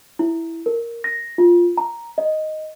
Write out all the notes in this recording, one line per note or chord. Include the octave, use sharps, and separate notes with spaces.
E4
A#4
A#6
F4
A#5
D#5